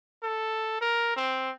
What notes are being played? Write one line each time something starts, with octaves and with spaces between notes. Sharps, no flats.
A4
A#4
C4